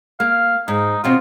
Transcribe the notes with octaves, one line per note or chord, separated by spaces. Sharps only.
A#3 F5
G#2 D#4
D#2 B2 C4 F4